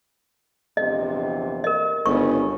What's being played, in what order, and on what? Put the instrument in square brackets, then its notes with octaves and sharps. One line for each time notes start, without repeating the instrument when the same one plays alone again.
[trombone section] A#1 E2 C3 [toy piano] D#5
[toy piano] A#4 D#5
[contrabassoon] G1 [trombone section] G#2 C#3 G3 [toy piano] C#6